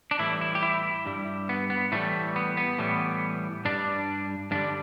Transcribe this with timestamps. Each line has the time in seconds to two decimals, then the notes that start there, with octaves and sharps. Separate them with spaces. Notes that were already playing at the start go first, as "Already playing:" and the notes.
0.11 D4
0.19 A2 E3 G3 E4
0.41 E4
0.55 G4
0.63 E4
1.06 G2 G3
1.49 B3
1.70 B3
1.92 A2 E3 G3 A3
2.36 B3
2.57 B3
2.78 A2 E3 G3
3.65 G2 G3 D4
4.51 G2 D3 G3 D4